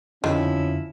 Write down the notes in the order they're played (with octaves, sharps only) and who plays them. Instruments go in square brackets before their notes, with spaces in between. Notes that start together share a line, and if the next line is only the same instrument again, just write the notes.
[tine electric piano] F2 D3 [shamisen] D#3 [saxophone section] F3 E4 [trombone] C#4